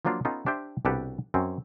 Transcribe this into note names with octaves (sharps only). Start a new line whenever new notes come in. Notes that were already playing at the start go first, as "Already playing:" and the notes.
F3 F#3 A#3 D4 F4
B3 C#4 D#4 F4 A4
D4 G4 C5 E5 G5
C2 B2 D4 G4 A4 B4
F#2 C4 C#4